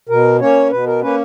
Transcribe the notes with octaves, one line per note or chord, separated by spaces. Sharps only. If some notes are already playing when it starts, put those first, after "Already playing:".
B2 A#4
A#3 C#4 C#5
B2 B4
A#4
A#3 C#4 B4